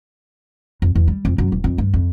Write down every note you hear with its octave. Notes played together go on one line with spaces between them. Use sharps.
F2
E2
G3
F2
F#2
D#1
F2
G2
F2